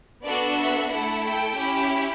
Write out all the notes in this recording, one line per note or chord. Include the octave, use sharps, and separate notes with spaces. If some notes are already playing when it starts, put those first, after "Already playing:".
B3 D4 F#4 A4 D5
E5
A3 E4 A4 F#5
G5
C#4 E4 G4